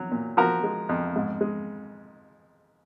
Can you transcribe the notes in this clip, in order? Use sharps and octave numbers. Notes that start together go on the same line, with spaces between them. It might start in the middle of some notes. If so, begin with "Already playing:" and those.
Already playing: F#3
A#2
F3 F#4 A#4
G#3
F2
G#2
G#3